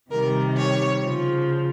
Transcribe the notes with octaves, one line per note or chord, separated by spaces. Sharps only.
C3 D#3 G3 A#4
C#5
C#3 F3